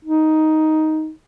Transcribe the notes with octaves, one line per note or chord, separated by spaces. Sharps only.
D#4